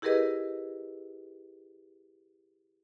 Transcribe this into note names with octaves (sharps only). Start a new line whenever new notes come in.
E4 G4 G#4 A#4 B4 D#5